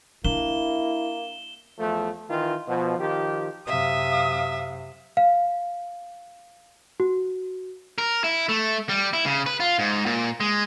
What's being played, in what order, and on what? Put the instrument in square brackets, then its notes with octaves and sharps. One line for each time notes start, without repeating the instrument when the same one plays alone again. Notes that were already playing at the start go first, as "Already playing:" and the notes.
[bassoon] A#3 [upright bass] D4 [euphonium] E4 [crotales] E7 G7
[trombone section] E2 F3 A3
D#3 E3 F4
B2 F3
D#3 F3 G4
[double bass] F#2 C3 [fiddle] E5 [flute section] F5 [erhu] D#6
[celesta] F5
F#4
[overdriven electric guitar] A#4
E4
A3
G3
E4
C#3
B4
F4
G#2
A#2
G#3